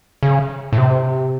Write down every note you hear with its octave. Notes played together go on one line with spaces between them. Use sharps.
C#3
A2
C3